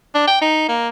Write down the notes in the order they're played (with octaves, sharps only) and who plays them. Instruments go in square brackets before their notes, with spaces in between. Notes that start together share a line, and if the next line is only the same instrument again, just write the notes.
[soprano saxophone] D4
G5
D#4
A#3